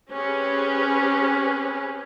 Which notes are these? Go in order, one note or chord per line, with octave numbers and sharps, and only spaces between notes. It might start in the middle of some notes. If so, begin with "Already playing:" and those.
C4 C#4 G4 G#4 B4